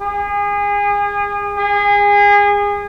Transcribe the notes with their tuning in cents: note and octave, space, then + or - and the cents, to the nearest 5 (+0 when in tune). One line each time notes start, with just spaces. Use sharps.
G#4 -30
G#4 -30